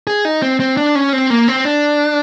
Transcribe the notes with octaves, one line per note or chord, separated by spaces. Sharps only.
G#4
D#4
C4
C4
D4
C#4
C4
A#3
C4
D4